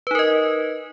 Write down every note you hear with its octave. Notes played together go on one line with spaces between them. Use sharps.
D#4 A#4 B4 D#5